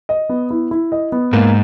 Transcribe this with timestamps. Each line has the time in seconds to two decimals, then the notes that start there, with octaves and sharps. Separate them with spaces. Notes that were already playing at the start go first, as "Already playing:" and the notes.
0.09 D#5
0.29 B3
0.50 E4
0.71 E4
0.92 D#5
1.12 B3
1.33 G#2 A#3